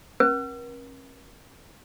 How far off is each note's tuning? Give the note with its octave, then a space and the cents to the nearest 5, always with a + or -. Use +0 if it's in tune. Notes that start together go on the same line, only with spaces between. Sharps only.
C#4 -45 A#4 +40